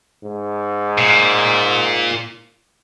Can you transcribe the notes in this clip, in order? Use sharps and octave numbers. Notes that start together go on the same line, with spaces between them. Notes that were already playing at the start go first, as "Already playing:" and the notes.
G#2
A#2